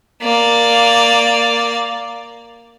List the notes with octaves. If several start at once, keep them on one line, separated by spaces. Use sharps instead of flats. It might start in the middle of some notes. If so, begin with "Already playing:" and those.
A#3 D5